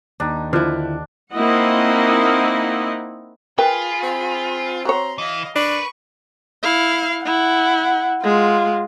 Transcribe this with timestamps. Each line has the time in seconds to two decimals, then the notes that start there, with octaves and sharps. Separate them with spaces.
0.20 D#2 D4 D#4
0.53 D3 F3 D4 E4
1.33 A#3 C4 D#4 E4 D#5 F#5
3.58 F4 G#4 A#4 B4 G5 B5
4.03 C4
4.85 F#4 C#5 A#5 C6
5.18 E3 D#5 F5
5.56 D4 A#4 B4 C#6
6.63 E4 F5
7.25 E4 F#5
8.23 G#3 F4